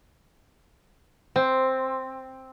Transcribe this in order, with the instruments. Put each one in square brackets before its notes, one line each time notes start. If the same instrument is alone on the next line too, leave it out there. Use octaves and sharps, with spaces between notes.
[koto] C4